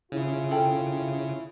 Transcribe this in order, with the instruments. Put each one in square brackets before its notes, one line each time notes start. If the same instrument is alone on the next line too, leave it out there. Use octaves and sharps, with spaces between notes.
[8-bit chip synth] C#3 [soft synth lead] E4 [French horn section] F4 G#4
[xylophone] A4 G5 A5